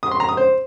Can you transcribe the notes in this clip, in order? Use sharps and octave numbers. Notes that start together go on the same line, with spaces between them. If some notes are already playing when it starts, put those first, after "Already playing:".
D#6
C6
A#5
D#6
C5